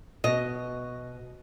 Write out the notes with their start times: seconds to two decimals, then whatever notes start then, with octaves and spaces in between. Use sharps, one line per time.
0.24 B2 D#5